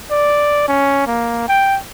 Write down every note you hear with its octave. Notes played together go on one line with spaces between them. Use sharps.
D5
C#4
A#3
G5